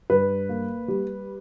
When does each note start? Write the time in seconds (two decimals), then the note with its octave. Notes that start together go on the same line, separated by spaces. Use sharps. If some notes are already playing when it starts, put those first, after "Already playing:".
0.10 G2 B4
0.49 A#3
0.88 G3